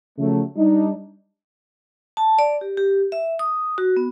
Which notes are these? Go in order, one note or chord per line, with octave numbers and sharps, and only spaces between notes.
C#3 F3 F#3 A3
G3 D4 D#4
A5
D5
G4
G4
E5
D#6
F#4
B3